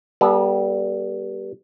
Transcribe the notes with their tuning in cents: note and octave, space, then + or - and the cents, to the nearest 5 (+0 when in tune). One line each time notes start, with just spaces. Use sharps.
G3 -5 B3 -45 A4 -35